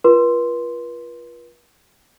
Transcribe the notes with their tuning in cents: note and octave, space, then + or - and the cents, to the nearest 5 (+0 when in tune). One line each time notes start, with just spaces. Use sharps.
F4 -20 B4 -40 C6 +0